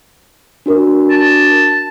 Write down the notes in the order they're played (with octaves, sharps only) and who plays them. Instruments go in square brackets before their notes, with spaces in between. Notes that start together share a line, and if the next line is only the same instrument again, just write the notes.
[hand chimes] D4 F#4 A#4
[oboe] A5